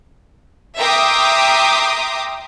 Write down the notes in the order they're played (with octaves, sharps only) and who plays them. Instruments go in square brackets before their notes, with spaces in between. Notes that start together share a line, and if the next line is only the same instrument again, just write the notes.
[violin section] E5 G5 A#5 C6 D6 D#6